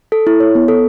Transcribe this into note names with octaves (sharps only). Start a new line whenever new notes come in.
A4
E4
C#5
B3
A4